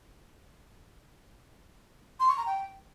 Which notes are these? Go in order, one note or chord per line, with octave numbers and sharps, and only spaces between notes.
C6
C#6
A#5
G5